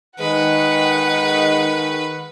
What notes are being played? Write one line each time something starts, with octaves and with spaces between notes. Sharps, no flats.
D#3 G#3 B4 F#5